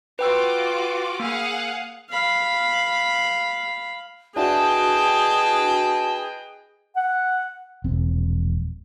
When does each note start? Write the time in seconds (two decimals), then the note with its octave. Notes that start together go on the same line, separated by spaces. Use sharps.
0.19 F4 F#4 B4 G5 D6 E6
1.20 A#3 G#4 F5 F#5
2.10 F5 B5
4.36 D4 E4 F#4 G#4 B4 D#5 G5 A5
6.96 F#5
7.84 E1 A#1 C4